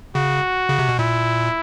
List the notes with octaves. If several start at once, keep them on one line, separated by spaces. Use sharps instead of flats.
C#3 F#4
C#3
C3
B2
A#2 E4